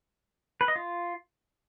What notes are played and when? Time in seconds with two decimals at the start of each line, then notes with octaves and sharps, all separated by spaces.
0.61 B4
0.68 D#5
0.76 F4